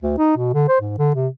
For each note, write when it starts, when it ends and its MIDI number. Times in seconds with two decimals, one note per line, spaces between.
0.02 0.13 38
0.18 0.35 63
0.37 0.52 47
0.54 0.64 50
0.68 0.78 72
0.81 0.94 44
0.98 1.10 50
1.15 1.28 48